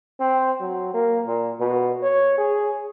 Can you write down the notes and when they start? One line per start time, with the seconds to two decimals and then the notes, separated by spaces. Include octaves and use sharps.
0.20 C4
0.60 F#3
0.94 A#3
1.27 A#2
1.60 B2
2.03 C#5
2.38 G#4